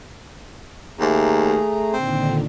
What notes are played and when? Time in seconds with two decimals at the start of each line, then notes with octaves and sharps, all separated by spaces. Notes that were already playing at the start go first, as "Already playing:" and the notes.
0.99 D#2 A3 G#4 A#5
1.93 A#2 D3 D#3 C4